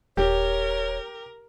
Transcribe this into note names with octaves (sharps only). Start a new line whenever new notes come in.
D#1 G4 A#4 C#5